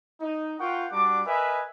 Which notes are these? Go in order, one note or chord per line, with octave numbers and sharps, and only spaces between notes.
D#4
F4 A#4 F#5 G5 C#6
G3 D4 F#4 D6
A#4 B4 D#5 E5 G#5